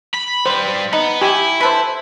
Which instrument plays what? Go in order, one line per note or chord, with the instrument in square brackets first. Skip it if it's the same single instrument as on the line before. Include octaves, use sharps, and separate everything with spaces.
[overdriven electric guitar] B5
[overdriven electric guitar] G3 B4 [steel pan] C5
[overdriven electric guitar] B3 [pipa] D#4
[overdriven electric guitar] E4 [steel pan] G4 G#5
[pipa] A4 B4 [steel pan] C5 B5